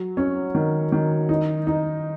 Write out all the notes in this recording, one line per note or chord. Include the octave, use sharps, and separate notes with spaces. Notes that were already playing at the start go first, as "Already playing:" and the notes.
Already playing: F#3
C#4
D#3
D#3
D#4
D#4